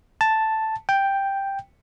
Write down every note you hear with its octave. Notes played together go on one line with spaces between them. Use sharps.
A5
G5